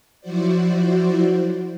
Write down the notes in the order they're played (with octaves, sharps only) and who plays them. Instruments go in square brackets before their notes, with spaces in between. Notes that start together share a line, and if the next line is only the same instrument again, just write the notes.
[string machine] F3 F#3 E4 F#4 C5 D5